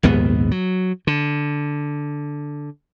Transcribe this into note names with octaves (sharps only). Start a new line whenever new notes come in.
A#1 D#2 G#2 B3
F#3
D3